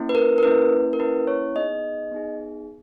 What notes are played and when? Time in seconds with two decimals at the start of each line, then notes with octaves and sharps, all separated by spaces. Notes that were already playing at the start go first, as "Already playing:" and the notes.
Already playing: A#3 C#4 E4
0.09 B4
0.15 A#4
0.38 A#4
0.43 A#3 C#4 E4 B4
0.93 A#4
0.99 A#3 C#4 E4 B4
1.27 C#5
1.55 B3 D#4 G#4 D#5
2.12 B3 D#4 G#4